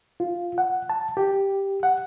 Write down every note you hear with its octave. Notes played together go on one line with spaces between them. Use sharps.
F4
F#5
A5
G4
F#5